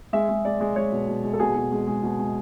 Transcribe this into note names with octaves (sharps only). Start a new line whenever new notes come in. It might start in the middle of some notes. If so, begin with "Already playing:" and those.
G#3 E5
G#3
G#3 D5
G#3
G#3 C#5
B2
B2
G#3
A4
B2 G#4
B2
G#3
G#3
B2
G#3